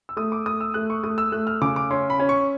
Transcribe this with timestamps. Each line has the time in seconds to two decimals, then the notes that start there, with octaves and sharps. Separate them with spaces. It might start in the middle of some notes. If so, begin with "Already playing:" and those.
0.09 E6
0.17 A3 D#6
0.32 D6
0.46 A3 D#6
0.61 E6
0.74 A3 F#6
0.90 C#6
1.04 A3 D#6
1.18 E6
1.32 A3 F#6
1.47 F6
1.61 C#3 D6
1.76 D6
1.91 C#4 C6
2.10 B5
2.20 C#4
2.29 C#6